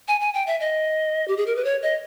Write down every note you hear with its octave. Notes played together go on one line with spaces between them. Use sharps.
G#5
G#5
G5
E5
D#5
G4
G#4
A#4
B4
C#5
D#5